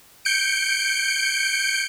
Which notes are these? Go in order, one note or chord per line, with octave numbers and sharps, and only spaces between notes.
G6 C#7 D7